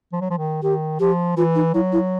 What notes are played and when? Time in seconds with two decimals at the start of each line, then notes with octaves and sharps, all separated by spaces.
0.12 F3
0.21 F#3
0.30 F3
0.38 D#3
0.62 D#3 G4
1.00 F3 G4
1.36 E3 F4
1.55 D#4
1.74 F#3 E4
1.92 E4